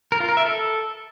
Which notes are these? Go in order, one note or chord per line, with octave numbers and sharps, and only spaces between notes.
A#4
F4
A#4
E5
A4